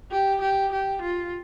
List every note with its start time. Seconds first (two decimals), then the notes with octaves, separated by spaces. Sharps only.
0.11 G4
0.41 G4
0.72 G4
1.02 F4